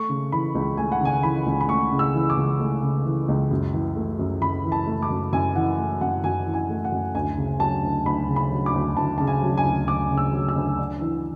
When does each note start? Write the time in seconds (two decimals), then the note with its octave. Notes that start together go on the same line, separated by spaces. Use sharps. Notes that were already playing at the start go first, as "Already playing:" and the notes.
Already playing: A3 C#6
0.09 C#3
0.32 E3 B5
0.55 C#2
0.77 A3 G#5
0.92 F#5
1.01 C#3 G#5
1.23 E3 B5
1.46 C#2
1.61 B5
1.68 A3 C#6
1.92 C#3
1.99 E6
2.14 E3
2.30 D6
2.37 C#2
2.60 A3
2.82 C#3
3.05 E3
3.28 C#2
3.51 F#2
3.74 E3
3.96 A3
4.19 F#2
4.42 F#2 B5
4.65 E3
4.72 A5
4.87 A3
5.03 D6
5.10 F#2
5.33 F#2 G#5
5.56 E3 F#5
5.78 A3
6.01 F#2 F#5
6.24 F#2 G#5
6.46 E3
6.54 G#5
6.70 A3
6.85 F#5
6.92 F#2
7.15 D2 G#5
7.38 C#3
7.60 F#3 A5
7.83 D2
8.06 D2 B5
8.28 C#3
8.36 B5
8.51 F#3
8.66 D6
8.74 D2
8.97 D2 A5
9.18 C#3 A5
9.27 G#5
9.42 F#3
9.57 G#5
9.65 D2
9.88 D2 D6
10.11 C#3
10.18 E6
10.33 F#3
10.49 E6
10.56 D2
10.79 D4
11.01 E3